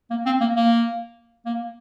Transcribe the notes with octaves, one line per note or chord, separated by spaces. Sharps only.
A#3
C4
A#3
A#3
A#3